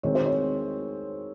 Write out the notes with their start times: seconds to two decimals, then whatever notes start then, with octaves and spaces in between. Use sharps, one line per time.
0.03 D#3 G#3 C4 D#4 C#5
0.15 C5
0.26 C#5